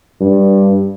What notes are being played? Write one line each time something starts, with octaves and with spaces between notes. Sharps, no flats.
G2